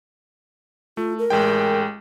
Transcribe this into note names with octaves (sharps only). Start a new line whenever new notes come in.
A3 F4
A#4
A1 G#3 G5